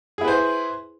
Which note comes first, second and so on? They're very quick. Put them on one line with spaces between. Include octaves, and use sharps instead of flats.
G#4 E4 B4 C5